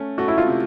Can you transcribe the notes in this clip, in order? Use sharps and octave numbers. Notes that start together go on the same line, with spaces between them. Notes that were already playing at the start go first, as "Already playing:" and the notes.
Already playing: A3 C#4
A3 F#4
E4
F4
C3